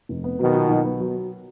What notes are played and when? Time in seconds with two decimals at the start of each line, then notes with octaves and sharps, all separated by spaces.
0.09 F1
0.24 B3
0.39 B2 D#3 F#3
0.54 A#2
0.69 B1
0.84 B3
1.00 F#3